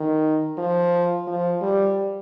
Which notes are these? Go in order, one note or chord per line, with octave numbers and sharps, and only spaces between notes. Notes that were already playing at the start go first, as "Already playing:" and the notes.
Already playing: D#3
F3
F3
G3